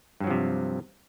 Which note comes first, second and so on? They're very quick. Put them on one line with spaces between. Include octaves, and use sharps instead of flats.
G2 F#3 F3 C3